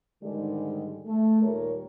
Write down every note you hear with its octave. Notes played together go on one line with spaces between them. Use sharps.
G#2 D3 D#3 G3 G#3
A3
D#2 A#2 G3 A#4 C#5